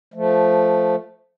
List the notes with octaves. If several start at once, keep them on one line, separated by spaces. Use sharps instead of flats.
F3 A3